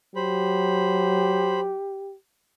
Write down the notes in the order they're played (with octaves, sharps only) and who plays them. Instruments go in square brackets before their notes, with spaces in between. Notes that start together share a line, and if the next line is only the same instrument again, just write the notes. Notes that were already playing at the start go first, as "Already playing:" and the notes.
[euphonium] F#3 [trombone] G4 [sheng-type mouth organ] C5 B5